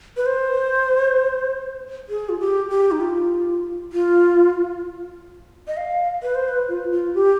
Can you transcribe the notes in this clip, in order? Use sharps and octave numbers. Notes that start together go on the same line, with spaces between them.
B4
C5
G#4
F4
G4
G4
D#4
F4
F4
D#5
F5
B4
C5
B4
F4
F4
G4